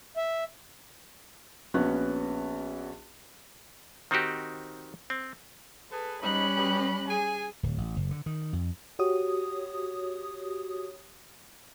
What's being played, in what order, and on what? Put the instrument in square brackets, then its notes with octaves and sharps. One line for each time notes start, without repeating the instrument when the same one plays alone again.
[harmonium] E5
[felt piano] A#1 B3 C#4 F#4 F#6
[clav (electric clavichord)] D#3 C4 D#4 F#4 G4
C4
[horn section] G#4 B4 [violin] A4
[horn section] G#2 D#4 [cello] G3 C#4 [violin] B5 F#6
[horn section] B2 F#3 G4
[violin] G#4 [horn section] G#5
[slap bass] D1
A1
F#1
D3
D#3
F2
[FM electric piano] F#4 G4 C#5 D#6